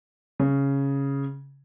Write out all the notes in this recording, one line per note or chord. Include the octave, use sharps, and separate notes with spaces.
C#3